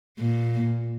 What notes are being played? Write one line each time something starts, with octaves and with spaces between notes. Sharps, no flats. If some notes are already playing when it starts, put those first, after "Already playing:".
A#2